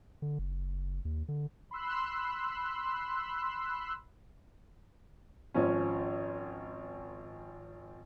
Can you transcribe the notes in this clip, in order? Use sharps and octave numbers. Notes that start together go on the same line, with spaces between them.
D3
F#1
D#2
D3
B5 C6 E6 F#6
G#1 F3 C#4